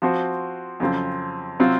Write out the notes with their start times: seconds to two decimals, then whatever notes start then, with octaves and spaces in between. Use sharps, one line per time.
0.02 F3 C4 F#4 C5
0.80 F2 C#3 F#3 C4 F4
1.59 C3 F#3 C4 F4